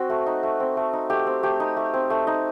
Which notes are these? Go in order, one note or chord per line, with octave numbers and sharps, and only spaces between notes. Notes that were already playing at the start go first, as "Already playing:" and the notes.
Already playing: C4 F#4
A3
D#4
A3
C4
A3
D#4
A3 G4
C4
A3 G4
D#4
A3
C4
A3
D#4